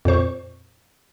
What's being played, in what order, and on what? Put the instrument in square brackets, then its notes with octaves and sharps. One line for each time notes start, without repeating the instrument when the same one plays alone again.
[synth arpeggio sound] F2 A#2 C5 C#6